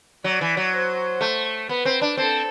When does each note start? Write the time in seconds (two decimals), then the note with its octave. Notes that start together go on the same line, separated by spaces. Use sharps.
0.24 F#3 D5
0.41 E3
0.57 F#3
0.73 C5
1.21 A3
1.69 B3 B4
1.85 C4
2.02 D4
2.17 C4 A4